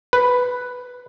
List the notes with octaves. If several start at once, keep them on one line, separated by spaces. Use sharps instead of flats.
B4